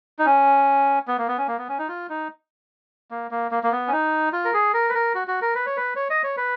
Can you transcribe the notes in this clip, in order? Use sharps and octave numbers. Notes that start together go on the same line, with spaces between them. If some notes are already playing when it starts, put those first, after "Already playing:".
D#4
C#4
B3
A#3
B3
C#4
A#3
B3
C#4
D#4
F4
D#4
A#3
A#3
A#3
A#3
B3
C#4
D#4
F4
A#4
G#4
A#4
B4
A#4
F#4
F#4
A#4
B4
C#5
B4
C#5
D#5
C#5
B4